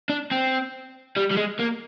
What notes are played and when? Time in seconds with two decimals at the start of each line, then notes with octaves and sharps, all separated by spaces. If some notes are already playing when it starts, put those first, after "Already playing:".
0.10 D4
0.31 C4
1.17 G3
1.31 G3
1.37 G#3
1.60 A#3